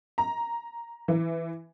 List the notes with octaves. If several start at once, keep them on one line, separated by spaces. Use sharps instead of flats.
A#5
E3